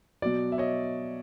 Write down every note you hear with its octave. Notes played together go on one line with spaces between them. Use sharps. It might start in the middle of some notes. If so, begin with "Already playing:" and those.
B2 F#3 D5
E5
C#5 D#5